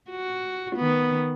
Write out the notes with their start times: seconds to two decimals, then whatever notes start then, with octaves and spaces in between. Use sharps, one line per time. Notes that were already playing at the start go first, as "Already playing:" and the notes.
0.10 F#4
0.76 D#3 B3